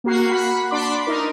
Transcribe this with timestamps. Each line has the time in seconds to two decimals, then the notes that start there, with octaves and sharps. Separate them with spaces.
0.04 A#3 F#4 C7
0.30 F#5 B5
0.71 D4 D5 B5 C6 D6
1.07 D#4 A#4